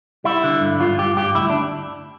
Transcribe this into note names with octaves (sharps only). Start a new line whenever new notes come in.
G3 E4
D3
G2
G2 F4
G2 G4
G2 G4
D2 E4
D4